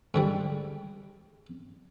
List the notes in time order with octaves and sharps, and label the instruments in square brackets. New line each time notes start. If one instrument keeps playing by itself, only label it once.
[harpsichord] G#2 D3 G3